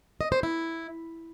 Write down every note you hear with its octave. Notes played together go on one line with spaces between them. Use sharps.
D#5
C5
E4